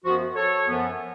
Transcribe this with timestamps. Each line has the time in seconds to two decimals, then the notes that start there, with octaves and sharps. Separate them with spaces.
0.04 F#2 F3 B3 F#4
0.35 A4 C#5
0.67 F#2 F3 B3